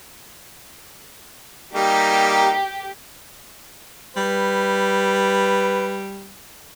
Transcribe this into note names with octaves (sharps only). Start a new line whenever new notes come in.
G3 A#3 D#4 G4
G3 B4